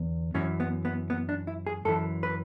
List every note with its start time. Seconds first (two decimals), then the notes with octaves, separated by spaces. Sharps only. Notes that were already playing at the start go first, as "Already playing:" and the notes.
Already playing: E2 D3
0.34 F#2 E3 C#4
0.60 B3
0.85 B3
1.10 B3
1.29 D4
1.47 E4
1.66 G#4
1.85 F#2 E3 A4
2.23 B4